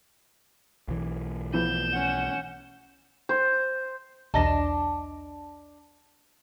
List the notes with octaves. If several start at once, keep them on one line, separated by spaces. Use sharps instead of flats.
B1 E3
F3 B3 E4 G6 E7
C#4 F#5
C5
B1 E2 D4 D#5 A5